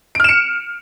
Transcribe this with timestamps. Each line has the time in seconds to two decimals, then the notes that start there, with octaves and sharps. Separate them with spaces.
0.15 D7
0.20 F6
0.24 E7
0.29 C#7